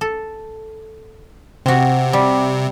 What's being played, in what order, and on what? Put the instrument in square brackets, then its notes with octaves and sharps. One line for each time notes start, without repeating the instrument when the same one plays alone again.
[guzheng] A4
[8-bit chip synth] C3 [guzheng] C4 F#4
[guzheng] G3